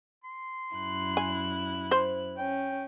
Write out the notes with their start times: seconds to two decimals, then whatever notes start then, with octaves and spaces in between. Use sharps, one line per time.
0.24 C6
0.74 F#2 E4 F#6
1.17 G#5
1.91 C5
2.38 C#4 G5